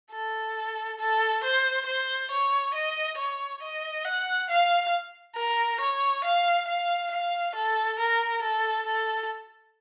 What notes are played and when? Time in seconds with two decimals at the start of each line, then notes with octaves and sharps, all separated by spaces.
0.11 A4
0.99 A4
1.43 C5
1.86 C5
2.31 C#5
2.74 D#5
3.17 C#5
3.62 D#5
4.04 F#5
4.49 F5
5.36 A#4
5.80 C#5
6.24 F5
6.68 F5
7.11 F5
7.55 A4
7.99 A#4
8.42 A4
8.85 A4